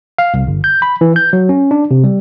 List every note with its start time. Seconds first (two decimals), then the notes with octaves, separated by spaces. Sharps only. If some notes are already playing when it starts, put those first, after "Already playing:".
0.18 F5
0.34 C2
0.47 G1
0.64 G6
0.82 B5
1.01 E3
1.16 G6
1.33 F#3
1.49 C#4
1.71 D4
1.91 C3
2.04 G3